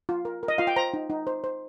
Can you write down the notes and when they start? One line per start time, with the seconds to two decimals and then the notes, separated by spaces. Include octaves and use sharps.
0.09 F4
0.25 A#4
0.43 A#4
0.48 D#5
0.58 F4 F5
0.67 G5
0.76 C5 A#5
0.94 D#4
1.10 D#4
1.27 C5
1.44 C5